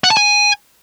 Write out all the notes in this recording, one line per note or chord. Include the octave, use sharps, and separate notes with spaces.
F#5
A5
G#5